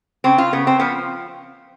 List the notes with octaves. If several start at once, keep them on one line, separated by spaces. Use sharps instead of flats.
C#3 C4
F4
C#3 B3
C4
F3 B3